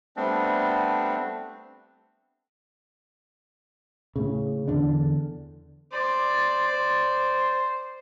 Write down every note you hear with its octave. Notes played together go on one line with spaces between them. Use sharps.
G3 A3 B3 C4 D4
A2 C#3
E2 D3 D4
C5 D5
C5